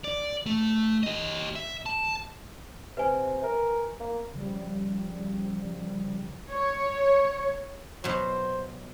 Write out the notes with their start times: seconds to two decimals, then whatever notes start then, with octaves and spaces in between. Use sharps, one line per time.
0.04 D5
0.46 A3
1.03 G4 D#5
1.56 E5
1.86 A5
2.97 C3 B4 G#5
3.43 A#4
4.00 A#3
4.34 C#3 F3 G3
6.49 C#5
8.04 B2 F#3 C5